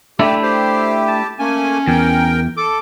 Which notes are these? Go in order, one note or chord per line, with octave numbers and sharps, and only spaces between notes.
A3 D4 E4 G4
G4 C5
A5
A3 A#3 C#4 G#5
E2 A#4 G5
A4 D6